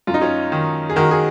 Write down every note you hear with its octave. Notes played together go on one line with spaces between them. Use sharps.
F#2 F4
D#4
C#4 F4
D#3
G#4
D#3 F#4 A#4
G#4